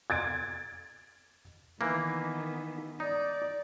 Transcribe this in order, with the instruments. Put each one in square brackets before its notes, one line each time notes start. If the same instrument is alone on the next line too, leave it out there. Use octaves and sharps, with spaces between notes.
[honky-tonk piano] G#6 A6 D7
[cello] D#3 B3 [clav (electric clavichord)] E3 A#3
[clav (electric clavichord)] D#4 [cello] D5